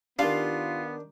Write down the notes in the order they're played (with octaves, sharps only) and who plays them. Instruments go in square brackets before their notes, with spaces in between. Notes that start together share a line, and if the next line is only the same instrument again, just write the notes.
[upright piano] D#3 G4 [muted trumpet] B3 [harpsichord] D4 [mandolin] F4